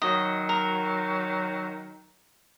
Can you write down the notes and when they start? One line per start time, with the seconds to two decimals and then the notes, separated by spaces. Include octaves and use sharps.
0.02 D#3 F#3 D#5
0.49 A#4